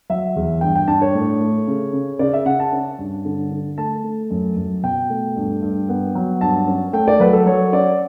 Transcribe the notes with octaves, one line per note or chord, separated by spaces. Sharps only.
F#3 E5
E2
G2 G5
G5
D4 A5
C#5
A2
A3
C#3
C#3
C#3 D5
E5
C#3 F#5
A5
C#4
G2
D3
D3
A3 A5
A3
F#2
F#2
B2 G5
A3
G2
G2
B3
F#3
G2 A5
C#4
A3 G5
D5
F#3 B4
A4
F#3 C#5
C#4 D5